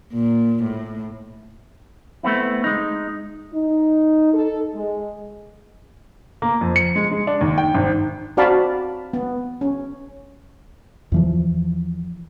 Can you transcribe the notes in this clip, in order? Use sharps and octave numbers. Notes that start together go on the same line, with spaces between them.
A#2
A2
A3 B3 C4 E4
G#3 D#4
D#4
A4
G#3
A#3
F2
C#7
G#3
G#3
D4
D#2
G5
G#1
C4 F#4 D5 F5 A5 B5
B3
C#4
E2 E3 F3